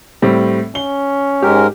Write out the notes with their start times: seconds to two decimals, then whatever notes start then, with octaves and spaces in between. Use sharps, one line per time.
0.22 A2 G3 C4
0.75 C#4 G7
1.42 G#2 G#3 G4 A#4